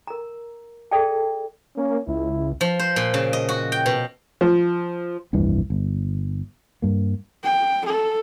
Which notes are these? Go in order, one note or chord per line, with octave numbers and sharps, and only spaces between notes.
A#4 A#5
G#4 A4 D5 E5 G5 A5
A#3 C#4
C#2 E4
F3
C5
A#2
C#3
D#5
F#4
G5
B2
F3
F1 C2 G2 E3
G1
G2 A#3
G5
A4